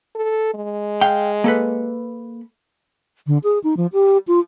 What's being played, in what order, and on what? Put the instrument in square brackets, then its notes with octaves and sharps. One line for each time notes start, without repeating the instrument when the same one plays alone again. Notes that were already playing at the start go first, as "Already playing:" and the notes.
[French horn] A4
G#3
[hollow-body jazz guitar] F5 G5
A#3 A4 B4
[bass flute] D3
G#4
D#4
F3
G4
F4